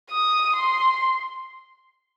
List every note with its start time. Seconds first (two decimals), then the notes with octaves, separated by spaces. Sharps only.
0.10 D#6
0.56 C6